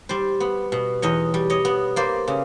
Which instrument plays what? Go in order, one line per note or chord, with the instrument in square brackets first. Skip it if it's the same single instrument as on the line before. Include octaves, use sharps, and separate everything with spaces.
[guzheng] G3 C5 D5
B3
B2
E2 C#5 D#5
G3
C#5 D#5
B3
A#3 C5 D5
C#3